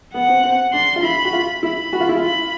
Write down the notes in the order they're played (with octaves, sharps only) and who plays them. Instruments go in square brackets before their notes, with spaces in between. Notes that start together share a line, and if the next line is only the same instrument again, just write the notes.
[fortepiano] B3 [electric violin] F#5
[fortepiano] C4
C4
[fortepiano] D4 [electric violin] C6
[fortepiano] F4
[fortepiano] E4 [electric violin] B5
[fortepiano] F#4
F4
[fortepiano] E4 [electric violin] B5
[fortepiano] F#4
F4
E4
F4
[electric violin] B5